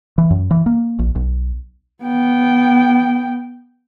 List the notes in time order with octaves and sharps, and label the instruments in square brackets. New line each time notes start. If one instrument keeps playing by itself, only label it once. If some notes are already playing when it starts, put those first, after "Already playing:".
[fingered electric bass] E3
F#2
E3
A#3
A#1
B1
[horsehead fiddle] B3 G5